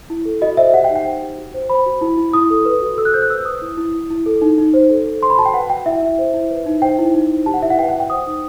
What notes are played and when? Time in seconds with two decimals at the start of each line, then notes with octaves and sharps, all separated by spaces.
0.10 E4
0.25 A4
0.41 F#4 D#5
0.57 C5 E5
0.73 G4 F#5
0.84 G5
0.90 D#4
0.96 G5
1.05 C5
1.21 G4
1.37 F#4
1.54 C5
1.70 C5 B5
1.86 F#4
2.01 E4
2.17 E4
2.33 E4 D#6
2.50 A4
2.65 B4
2.82 F#4
2.97 A4 E6
3.05 F#6
3.14 C5 G6
3.22 F#6
3.30 B4 E6
3.45 B4 D#6
3.62 E4
3.77 E4
3.94 E4
4.10 E4
4.26 A4
4.42 D#4
4.58 D#4
4.74 C5
4.90 A4
5.06 A4
5.23 C5 C6
5.30 B5
5.38 F#4 A5
5.46 G5
5.54 B4 F#5
5.70 F#4 G5
5.86 E4 E5
6.03 E4
6.18 C5
6.34 E4
6.50 B4
6.66 D#4
6.82 C5 G5
6.99 E4
7.14 D#4
7.31 C5
7.46 G4 A5
7.54 F#5
7.63 E4 E5
7.70 F#5
7.78 B4 G5
7.89 F#5
7.94 F#4
8.00 G5
8.10 C5 D#6
8.26 D#4